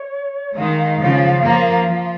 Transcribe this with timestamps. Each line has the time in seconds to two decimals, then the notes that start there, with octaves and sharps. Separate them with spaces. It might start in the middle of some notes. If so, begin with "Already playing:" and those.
Already playing: C#5
0.56 D#3 G#3 F5
1.00 C#3 F3
1.44 F3 A#3
1.88 F3